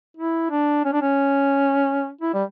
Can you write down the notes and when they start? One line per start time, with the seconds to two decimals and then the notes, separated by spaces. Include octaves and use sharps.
0.17 E4
0.50 D4
0.85 C#4
0.93 D4
1.02 C#4
2.21 E4
2.34 G3